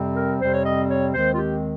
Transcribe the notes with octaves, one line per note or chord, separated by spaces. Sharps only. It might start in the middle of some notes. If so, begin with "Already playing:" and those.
Already playing: F2 C3 G3 C4
A#4
F2 C3 G3 C4 C5
C#5
D#5
C#5
D#2 D#3 G#3 C4 C5
F4
G4